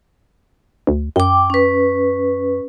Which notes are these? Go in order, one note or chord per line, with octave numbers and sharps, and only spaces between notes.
D2
F#2 G5 D6
C#4 B4